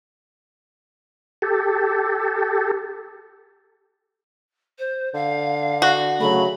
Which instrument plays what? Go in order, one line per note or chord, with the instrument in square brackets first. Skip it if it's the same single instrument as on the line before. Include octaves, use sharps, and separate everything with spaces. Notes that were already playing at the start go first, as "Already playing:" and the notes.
[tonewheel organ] G4 A4
[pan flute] C5
[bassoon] D3 [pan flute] F5
[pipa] F#4
[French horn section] C#3 F#3 A3 [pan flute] B5